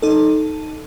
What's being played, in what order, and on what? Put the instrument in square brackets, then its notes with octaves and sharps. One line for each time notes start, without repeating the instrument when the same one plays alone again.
[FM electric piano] D#4 A4